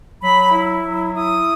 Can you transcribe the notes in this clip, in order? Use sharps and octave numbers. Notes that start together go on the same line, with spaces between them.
F#3 B5
E4
F#3
E4 D#6